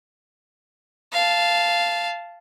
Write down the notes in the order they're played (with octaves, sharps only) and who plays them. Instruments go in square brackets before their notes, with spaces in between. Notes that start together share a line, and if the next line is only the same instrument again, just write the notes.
[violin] F5 A5